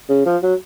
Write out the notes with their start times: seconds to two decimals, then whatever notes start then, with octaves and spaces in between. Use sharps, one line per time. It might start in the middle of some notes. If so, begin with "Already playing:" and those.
0.09 C#3
0.26 F3
0.43 F#3